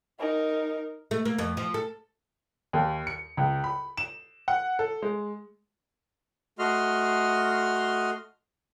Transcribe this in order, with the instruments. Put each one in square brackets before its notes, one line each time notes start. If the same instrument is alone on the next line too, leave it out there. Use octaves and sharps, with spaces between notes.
[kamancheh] D#4 A#4
[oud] A3
A#3
F2
F3
A4
[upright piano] D#2
C#7
C#2
B5
E7
F#5
A4
G#3
[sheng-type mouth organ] A3 F#4 D#5 C6 F6